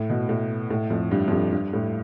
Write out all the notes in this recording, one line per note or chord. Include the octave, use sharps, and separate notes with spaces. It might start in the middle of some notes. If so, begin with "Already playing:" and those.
Already playing: A2
B2
A2
A2
F2
G2
F2
G2
G2
A2